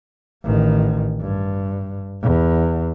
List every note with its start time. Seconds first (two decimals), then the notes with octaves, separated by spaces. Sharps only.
0.44 A1 D#3
1.21 G2
2.22 E2